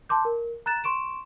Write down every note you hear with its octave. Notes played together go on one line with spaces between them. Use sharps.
A5 C6 D6 G6
A#4
A#5 F#6 A6 E7
C6 C#6 D7 E7